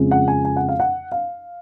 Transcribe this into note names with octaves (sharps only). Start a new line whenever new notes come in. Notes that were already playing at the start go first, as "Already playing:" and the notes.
Already playing: F2 C#3 F3 G#3
F#5
G#5
G#5
F#5
F5
F#5
F5